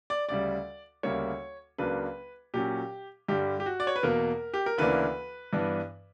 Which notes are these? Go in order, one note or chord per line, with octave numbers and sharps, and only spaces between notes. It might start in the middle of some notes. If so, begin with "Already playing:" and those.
D5
D2 C#3 G3 D5
D2 C#3 G3 A#3 C#5
C#2 C#3 F#3 A#3 D4 B4
A#2 F#3 C#4 G4
G2 D3 G3 G4
G4
F#4
D5
C#5
B4
E2 B2 A#3 A#4
G4
A#4
D2 C#3 E3 A#3 D4 B4
G2 E3 B3 D4